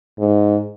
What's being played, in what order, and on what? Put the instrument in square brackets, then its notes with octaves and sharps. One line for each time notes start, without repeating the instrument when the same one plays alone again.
[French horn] G#2